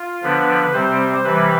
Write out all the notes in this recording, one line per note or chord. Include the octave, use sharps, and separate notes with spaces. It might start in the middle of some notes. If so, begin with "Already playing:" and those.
Already playing: F4
D3 F3 B3 D4 B4
C3 G3 C4 C5
C3 E3 G3 B4